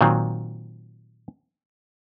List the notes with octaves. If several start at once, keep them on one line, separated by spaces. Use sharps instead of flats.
A#2 D#3 F#3 C4